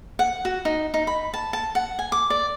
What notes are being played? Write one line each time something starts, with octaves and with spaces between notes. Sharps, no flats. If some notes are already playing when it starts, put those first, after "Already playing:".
F#5
F#4
D#4
D#4
B5
A5
A5
F#5
G#5
D6
D5